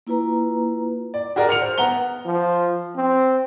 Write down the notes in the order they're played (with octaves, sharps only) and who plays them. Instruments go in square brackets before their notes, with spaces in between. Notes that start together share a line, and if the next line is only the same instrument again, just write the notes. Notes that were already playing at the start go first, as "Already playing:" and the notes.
[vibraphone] A#3 E4 F4 B4 A#5
[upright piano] D5
F#4 G#4 A#4 D5
F6 C#7 F7
C5
B3 F#5 A#5 F7 G7
[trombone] F3
C4